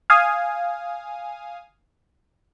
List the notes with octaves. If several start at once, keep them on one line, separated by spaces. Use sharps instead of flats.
F5 G#5 D#6